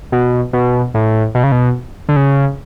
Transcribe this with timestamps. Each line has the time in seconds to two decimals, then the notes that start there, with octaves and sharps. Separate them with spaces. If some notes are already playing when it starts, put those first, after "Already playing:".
0.12 B2
0.53 B2
0.94 A2
1.35 B2
1.43 C#3
1.52 B2
2.09 D3
2.16 C#3